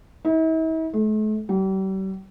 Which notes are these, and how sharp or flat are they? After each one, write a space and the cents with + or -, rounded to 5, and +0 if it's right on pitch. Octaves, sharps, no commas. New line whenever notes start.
E4 -45
A3 -40
G3 -40